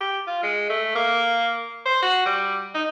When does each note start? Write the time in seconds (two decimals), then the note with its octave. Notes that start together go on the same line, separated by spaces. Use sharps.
0.01 G4
0.27 F4
0.43 G#3
0.70 A3
0.95 A#3
1.86 C5
2.02 F#4
2.26 G3
2.75 D#4